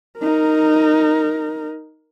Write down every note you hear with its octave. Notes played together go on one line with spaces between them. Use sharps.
D#4 A#4